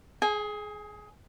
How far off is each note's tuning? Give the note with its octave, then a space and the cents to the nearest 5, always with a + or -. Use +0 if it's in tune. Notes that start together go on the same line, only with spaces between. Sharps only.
G#4 +20 G#5 -25